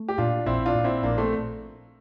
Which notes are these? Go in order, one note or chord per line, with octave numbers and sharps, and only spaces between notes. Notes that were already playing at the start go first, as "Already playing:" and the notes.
Already playing: A3
G4
A#2 D4 F4
A#1 C4 E4
D4 F4
A#2
C4 E4
A#1 A#3 D4
A3 C4